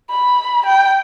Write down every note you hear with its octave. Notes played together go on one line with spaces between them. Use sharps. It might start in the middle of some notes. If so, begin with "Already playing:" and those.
B5
G5